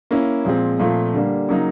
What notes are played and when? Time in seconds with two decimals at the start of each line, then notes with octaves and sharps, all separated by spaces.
0.11 A#3 C#4 E4
0.45 A#2 F3 G#3 C4
0.79 A#2 F3 A3 C4 F4
1.14 D3 G3 A#3 D4
1.48 C#3 F#3 A#3 D#4